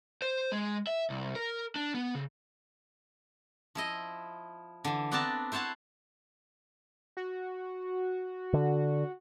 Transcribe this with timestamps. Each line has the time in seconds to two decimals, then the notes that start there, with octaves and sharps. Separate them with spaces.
0.22 C5
0.52 G#3
0.87 E5
1.10 C2
1.35 A#4
1.76 D4
1.94 B3
2.15 C#3
3.75 F3 E4 D#5
4.85 D3 E3
5.12 B3 C4 D4 D5 A5 A#5
5.52 E4 C5 C#5 F#5 A5
7.17 F#4
8.53 D3